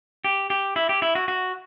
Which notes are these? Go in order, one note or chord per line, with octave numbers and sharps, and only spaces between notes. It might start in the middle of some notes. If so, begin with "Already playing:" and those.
G4
G4
E4
G4
E4
F#4
F#4